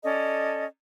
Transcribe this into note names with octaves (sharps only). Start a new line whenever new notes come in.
C#4 A4 D5 D#5